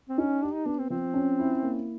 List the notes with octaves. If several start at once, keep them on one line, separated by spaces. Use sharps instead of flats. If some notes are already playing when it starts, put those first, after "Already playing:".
C4
C#4 D#4
D4 G4
D#4
B3 D4
C4
F3 C4
C#4
E4
A#3